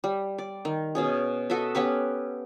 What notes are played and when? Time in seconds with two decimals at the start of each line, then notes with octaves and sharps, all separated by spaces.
0.04 G3
0.38 D5
0.65 D#3
0.95 B2 C#4 G#4
1.50 F#4 A4 D#5 E5
1.75 B3 C#4 G4 B4